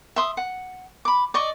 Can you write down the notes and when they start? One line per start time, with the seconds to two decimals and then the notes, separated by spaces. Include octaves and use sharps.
0.16 E5 C6 D#6
0.37 F#5
1.05 B5 D6
1.34 D5 D#5 C#6